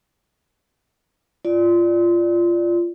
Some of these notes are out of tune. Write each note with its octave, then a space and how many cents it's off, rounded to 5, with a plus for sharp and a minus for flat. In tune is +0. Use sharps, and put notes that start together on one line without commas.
F4 -15 D5 +0